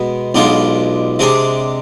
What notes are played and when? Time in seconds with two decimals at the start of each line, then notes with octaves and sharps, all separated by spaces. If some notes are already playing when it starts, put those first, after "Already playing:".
Already playing: B2 G#3 B3
0.35 B1 B2 G#3 D4 F4
1.19 C3 G#3 D4 G#4